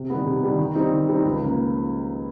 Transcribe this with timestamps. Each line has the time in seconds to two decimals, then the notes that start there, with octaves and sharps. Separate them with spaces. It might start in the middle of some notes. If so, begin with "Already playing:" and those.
Already playing: C3
0.10 D#3 G3 B3
0.26 C3
0.43 D#3 G3 B3
0.59 D#3
0.75 G3 C4 D#4
0.92 D#3
1.08 G3 C4 D#4
1.25 C#2
1.41 C#3 F3 A#3